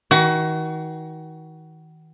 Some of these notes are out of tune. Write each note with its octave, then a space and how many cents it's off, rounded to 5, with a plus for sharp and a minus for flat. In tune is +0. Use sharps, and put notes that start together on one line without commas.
D#3 +40 F#4 +30